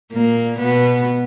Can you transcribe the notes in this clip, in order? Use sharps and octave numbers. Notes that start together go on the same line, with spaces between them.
A#2 A#3
B2 B3